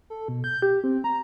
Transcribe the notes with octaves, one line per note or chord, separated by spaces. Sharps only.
A4
B2
G6
G4
C4
A#5